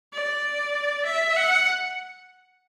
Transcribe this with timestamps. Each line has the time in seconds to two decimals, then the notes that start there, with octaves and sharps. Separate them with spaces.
0.13 D5
1.06 E5
1.36 F#5